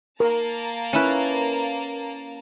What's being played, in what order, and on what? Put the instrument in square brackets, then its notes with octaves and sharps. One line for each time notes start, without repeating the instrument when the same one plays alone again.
[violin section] A#3 A5 A#5 [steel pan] A#4
[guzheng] C#4 E4 B4